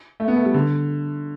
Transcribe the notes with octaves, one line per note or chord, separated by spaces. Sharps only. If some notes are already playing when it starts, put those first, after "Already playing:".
A3
B3
A3
G3
D3